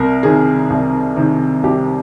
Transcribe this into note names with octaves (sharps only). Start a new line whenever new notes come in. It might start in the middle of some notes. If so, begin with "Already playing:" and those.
Already playing: C2 A#4
C3 D#3 G#4
C2
C3 D#3
C2 G4